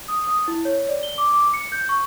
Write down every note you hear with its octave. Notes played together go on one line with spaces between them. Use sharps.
D#6
D#6
E4
C#5
D5
G7
D6
D6
C#7
G6
C#6